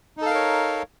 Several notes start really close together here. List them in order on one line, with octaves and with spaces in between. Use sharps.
D#4 A4 F5 A#4 C#5